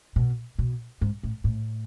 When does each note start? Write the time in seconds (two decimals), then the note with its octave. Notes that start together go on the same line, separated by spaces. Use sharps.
0.16 B2
0.59 B2
1.01 G#2
1.23 A2
1.44 A2